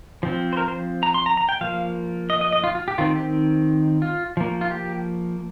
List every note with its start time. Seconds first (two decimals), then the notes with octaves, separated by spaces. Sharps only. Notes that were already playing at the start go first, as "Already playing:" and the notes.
0.23 F3 C4
0.53 C5
0.57 A#4
0.68 C5
1.03 A#5
1.14 C6
1.26 A#5
1.37 A#5
1.49 G5
1.61 F3 A#3 F5
2.30 D#5
2.41 D#5
2.52 D#5
2.64 F4
2.75 F4
2.88 G4
2.98 D#3 C4 F4
3.16 G4
4.02 F4
4.37 F3 A#3
4.61 F4
4.71 G4